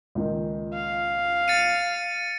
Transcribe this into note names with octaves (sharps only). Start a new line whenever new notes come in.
C#2 A#2 D#3
F5
A6 C#7 D#7